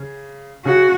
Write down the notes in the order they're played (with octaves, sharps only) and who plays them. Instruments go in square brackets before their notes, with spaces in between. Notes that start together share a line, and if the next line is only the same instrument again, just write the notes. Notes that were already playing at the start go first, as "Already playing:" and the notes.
Already playing: [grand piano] C#3
[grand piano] C#3 [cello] F#4